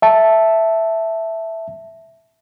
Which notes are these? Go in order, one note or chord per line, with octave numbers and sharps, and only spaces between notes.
E5 A5